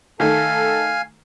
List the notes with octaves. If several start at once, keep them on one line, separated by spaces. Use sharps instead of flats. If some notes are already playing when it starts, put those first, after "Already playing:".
D#3 A3 A4 F5 G#5